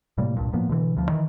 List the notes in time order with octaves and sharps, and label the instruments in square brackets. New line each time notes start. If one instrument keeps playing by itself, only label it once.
[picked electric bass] A2 C3 G3 A#3
C2 G2 A#2
A2 F3 A#3 B3
B2 D3 E3
D2 F3
D#3 E3